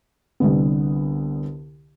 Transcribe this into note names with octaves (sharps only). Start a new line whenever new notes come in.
C2 D3 B3